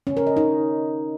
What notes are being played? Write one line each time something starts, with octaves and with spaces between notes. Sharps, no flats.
C#4
A#4
D#5
D#4